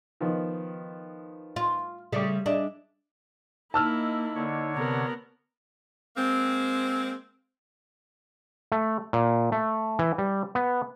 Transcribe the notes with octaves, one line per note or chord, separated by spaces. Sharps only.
D#3 F3 B3
F4
C#3 G3 A3 E5 D6
D4 G#4 D#5 E5
A#3 D#4 E4 A5 E6 F6
D3 C#5
C3 B3 A#4
G#3 A#3 C4
A3
A#2
A3
E3
G3
B3